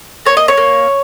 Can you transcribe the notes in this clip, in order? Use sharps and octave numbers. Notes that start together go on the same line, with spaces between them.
A#3 C#5
D#5
C#5
A#3